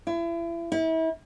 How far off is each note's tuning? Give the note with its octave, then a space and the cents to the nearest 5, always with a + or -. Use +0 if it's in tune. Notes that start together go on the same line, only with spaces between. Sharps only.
E4 +35
E4 -35